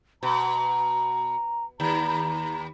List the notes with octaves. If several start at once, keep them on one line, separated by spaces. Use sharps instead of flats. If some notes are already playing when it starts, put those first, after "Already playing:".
B2 A#5
D#2 A#5